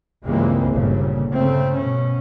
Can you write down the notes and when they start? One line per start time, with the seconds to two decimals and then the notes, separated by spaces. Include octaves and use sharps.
0.25 C#2 G2 E3 G#3 A#3 C4
0.71 G1 A#2 C#3
1.32 C#3 A3 C4
1.75 B2 C#4